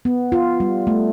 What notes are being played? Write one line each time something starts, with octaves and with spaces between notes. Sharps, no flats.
B3
F4
G3
A3